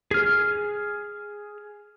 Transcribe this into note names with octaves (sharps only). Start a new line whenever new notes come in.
G#4 F6